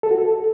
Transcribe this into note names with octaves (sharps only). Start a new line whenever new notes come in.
A4
F#4
A4